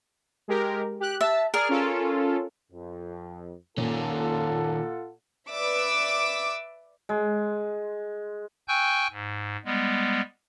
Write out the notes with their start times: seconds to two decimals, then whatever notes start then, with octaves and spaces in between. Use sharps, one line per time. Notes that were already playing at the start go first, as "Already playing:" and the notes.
0.48 G#3 G4 A#4
1.00 G4 F#6
1.21 E5 A5
1.54 G#4 A#4 D5 F6
1.69 C#4 F4 A4
2.71 F2
3.78 A#2 D#3 C#4 F4 A4 F#5
5.49 B4 D5 E5 D6 E6
7.09 G#3
8.68 G5 G#5 C#6 E6 F#6 G6
9.11 G#2
9.65 G3 G#3 B3